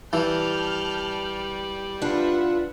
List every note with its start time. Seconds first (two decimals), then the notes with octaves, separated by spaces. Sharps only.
0.13 E3 G3 A5 F6 G6
2.02 D4 F4 B4 E5 F#5